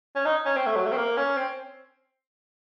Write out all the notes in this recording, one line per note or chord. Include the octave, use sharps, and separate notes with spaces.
C#4
D#4
C#4
C4
A3
F#3
A3
C4
A#3
C#4
C4